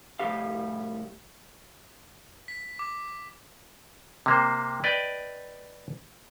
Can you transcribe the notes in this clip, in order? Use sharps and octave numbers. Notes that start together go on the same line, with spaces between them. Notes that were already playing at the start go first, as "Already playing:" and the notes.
C2 A2 E3 G3 G4 F5
B6
D6
C3 A#3 C5
B4 D5 D#5 G5